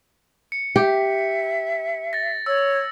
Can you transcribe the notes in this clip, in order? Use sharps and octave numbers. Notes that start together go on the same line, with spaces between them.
C#7
G4 E5
A6 A#6
C#5 E6